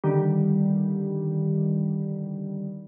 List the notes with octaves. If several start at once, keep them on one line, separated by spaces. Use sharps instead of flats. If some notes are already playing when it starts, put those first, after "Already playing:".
D3 D#3 G3